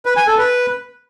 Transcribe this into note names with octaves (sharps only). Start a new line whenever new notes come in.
B4
G#5
A4
B4